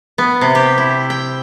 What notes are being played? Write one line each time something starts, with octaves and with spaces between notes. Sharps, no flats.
B3
C3
G4
E4
G5